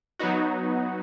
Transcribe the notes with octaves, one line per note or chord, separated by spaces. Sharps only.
F#3 B3 D#4 F#4